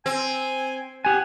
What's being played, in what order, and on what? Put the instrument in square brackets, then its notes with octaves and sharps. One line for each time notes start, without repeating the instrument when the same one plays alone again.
[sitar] C4 [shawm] G#5
[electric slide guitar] G4 G#5 [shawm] F#5